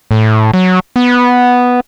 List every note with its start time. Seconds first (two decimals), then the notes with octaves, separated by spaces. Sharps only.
0.11 A2
0.54 F#3
0.96 B3